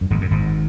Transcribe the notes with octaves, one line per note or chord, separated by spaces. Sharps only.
F#2
G#1 G#2
F#2
G#1 G#2